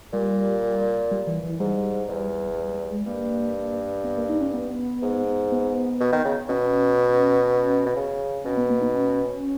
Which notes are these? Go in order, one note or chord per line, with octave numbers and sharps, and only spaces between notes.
A#2 G3
G3
E3
E3
G#2 G3
E2
G3
G3
G#3
G2 A#3
B3
A#3
D#4
C#4
B3
G#2
B3
B2
D#3
C#3
B2 C#4
B2
C#3
B2 C#4
B3
A#3
D#4
C#4